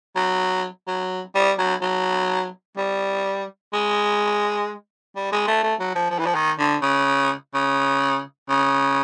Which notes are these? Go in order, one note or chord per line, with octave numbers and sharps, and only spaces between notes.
F#3
F#3
G3
F#3
F#3
G3
G#3
G3
G#3
A3
A3
F#3
F3
F3
E3
F3
D#3
D3
C#3
C#3
C#3